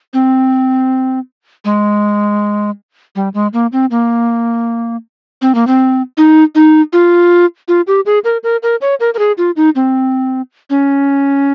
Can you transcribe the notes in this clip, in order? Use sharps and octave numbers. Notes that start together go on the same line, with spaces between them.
C4
G#3
G3
G#3
A#3
C4
A#3
C4
A#3
C4
D#4
D#4
F4
F4
G4
G#4
A#4
A#4
A#4
C#5
A#4
A#4
G#4
F4
D#4
C4
C#4